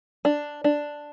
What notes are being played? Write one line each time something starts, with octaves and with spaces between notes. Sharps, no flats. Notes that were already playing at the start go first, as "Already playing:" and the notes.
D4
D4